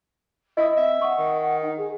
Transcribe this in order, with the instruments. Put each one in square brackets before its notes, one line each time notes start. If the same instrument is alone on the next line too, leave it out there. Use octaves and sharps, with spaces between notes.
[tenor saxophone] E4 [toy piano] D#5 D#6
[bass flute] C4 [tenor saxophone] E5
[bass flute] F#5 [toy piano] C#6 D#6
[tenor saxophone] D#3
[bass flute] D#4
G#4